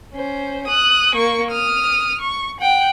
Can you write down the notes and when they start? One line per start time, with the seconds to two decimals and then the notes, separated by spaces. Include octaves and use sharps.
0.14 C#4 C5
0.67 D#6 F#6
1.15 A#3 C#6
1.51 D#6 F6
2.21 C#6
2.60 F#5 G5